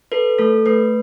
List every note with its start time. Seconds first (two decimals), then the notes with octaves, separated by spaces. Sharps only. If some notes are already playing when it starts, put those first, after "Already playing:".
0.12 A4 B4
0.38 A3 A4
0.66 A3 B4